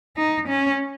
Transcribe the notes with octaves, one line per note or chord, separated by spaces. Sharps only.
D#4
C#4